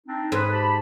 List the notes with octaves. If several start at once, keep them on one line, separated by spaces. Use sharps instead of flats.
C4 D4 D#4
G#2 B4
G4 A5 B5